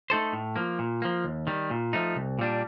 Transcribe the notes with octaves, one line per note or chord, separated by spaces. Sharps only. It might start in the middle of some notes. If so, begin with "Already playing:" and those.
A3 D#4 A4 C5
A2
F3 A#3
A#2
F3 A#3
D#2
D#3 G3
A#2
F3 A3 D#4
C2
A#2 G3 D4